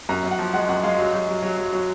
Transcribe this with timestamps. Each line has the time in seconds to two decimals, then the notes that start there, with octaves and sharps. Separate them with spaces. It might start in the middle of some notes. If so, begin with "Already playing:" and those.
0.09 F#2 A#5
0.24 F#2
0.31 F#5
0.39 F3
0.53 G#3 F#5
0.69 F#2 F#5
0.83 G#3 F5
0.98 F#3
1.13 F#3
1.28 F#3
1.42 F#3
1.57 F#3
1.72 F#3